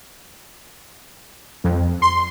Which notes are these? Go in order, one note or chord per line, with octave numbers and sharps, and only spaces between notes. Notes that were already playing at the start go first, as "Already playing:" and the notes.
F2
C6